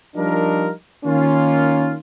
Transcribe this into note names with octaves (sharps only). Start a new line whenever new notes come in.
F3 G3 D4 D#4 F4 A#4
D#3 A#3 C#4 F4